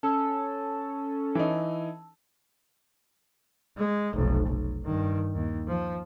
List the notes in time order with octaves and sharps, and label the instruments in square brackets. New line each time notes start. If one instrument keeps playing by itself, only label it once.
[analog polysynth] C#4 A4 [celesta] A5 E6
[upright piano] E3 D#4
[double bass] G#3
F1 B1
B1
G2 D#3
D#2
F3